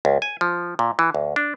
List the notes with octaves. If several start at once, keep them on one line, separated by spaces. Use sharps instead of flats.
C#2
G#5
F3
A#2
E3
D2
D4